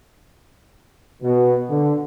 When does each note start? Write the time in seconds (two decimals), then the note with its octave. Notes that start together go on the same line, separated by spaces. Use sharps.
1.23 B2
1.70 D3